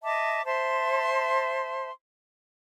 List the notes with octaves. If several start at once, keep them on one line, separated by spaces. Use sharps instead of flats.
D#5 E5 A5 D6
C5 E5 A5 C6